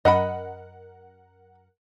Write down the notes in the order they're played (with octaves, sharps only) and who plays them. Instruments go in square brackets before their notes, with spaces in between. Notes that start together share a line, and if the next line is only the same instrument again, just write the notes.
[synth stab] F#2 A#4 F#5 [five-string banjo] D#5 B5